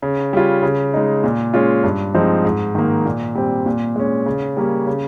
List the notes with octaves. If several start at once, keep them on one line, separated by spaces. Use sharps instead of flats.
C#3
G3 C#4 F4
C#3
G#3 D#4
A#2
G#3 C#4 F4
G2
F3 G#3 C4 D#4
G#2
D#3 A#3
A#2
G3 C4
A#2
G#3 C#4
C#3
G3 A#3 C#4
C#3